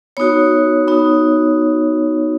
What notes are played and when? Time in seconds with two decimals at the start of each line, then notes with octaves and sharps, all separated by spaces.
0.17 B3 D#4 F#4 C#5
0.88 B3 D#4 F#4